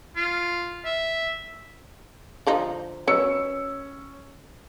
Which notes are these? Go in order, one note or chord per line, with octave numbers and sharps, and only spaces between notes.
F4
E5
D3 F3 D#4
D#3 F#3 C#4 B4 E6 C#7